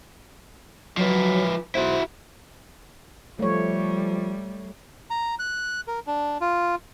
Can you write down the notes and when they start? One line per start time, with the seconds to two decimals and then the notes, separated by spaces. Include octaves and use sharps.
0.97 F3 F#3 B4
1.75 B1 E4 F#4 C5
3.39 F3 G3 A3 C#5
5.10 A#5
5.39 F#6
5.88 A#4
6.07 D4
6.41 F4